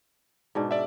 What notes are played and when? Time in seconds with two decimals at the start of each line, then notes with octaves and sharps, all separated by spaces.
0.55 G#2 B2 D4
0.71 D5 E5